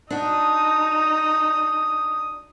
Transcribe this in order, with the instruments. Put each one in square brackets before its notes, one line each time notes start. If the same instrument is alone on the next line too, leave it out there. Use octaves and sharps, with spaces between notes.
[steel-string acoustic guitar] D4 F#4 [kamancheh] D#4 [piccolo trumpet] D#6